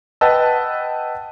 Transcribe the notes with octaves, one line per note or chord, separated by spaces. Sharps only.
B4 D#5 F#5 G5 A5 E6